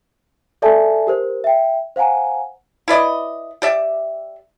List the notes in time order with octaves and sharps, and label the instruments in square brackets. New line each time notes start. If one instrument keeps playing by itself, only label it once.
[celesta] G#4 A4 D5 E5 G#5 A5
G4 A#4 C5
E5 G5
C5 F5 F#5 G#5 A#5
[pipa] E4 B4 D5 D#5
G4 D5 E5